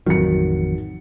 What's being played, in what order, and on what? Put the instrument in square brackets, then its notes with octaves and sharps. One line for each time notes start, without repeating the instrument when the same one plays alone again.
[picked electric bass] A1 F2 D#3 [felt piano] F#3 C#7